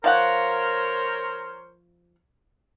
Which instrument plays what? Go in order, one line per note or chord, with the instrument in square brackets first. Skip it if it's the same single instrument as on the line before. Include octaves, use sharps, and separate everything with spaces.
[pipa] F3 F5 F#5 [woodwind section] A#4 C5 C#5